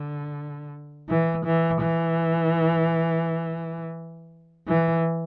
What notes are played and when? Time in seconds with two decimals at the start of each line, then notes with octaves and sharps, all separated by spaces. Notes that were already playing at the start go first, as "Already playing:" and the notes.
Already playing: D3
1.10 E3
1.45 E3
1.81 E3
4.68 E3